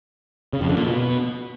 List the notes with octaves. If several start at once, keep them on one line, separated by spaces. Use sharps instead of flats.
C#3
F2
D3
A#2
B2